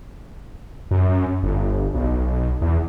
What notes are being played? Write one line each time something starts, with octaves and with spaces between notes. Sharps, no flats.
F#2
G1
B1
E2